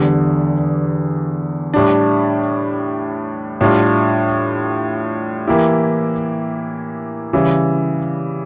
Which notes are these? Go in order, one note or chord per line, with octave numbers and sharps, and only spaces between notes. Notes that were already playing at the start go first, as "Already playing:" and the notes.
Already playing: E2 D3 G3
A2 G3 D4
A2 G3 D4 F4
E3 A#3 E4 G4
C#3 E3 G3